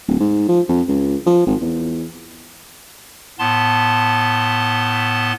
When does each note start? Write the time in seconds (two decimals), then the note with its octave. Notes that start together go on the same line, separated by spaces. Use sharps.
0.08 D1
0.20 G#2
0.48 F3
0.69 F2
0.88 C#2
1.26 F3
1.46 G#1
1.61 E2
3.39 A2 B3 A5 C6